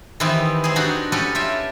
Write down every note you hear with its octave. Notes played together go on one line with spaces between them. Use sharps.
D#3 E3 B3 C4 E4 G4
C4 G#4
D4 D#4 F#4 G4
C#4 F#4 G4 A4 B4
F4 G4 E5